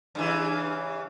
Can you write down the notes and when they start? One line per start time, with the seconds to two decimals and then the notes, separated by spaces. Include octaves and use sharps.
0.15 G2 C#3 E3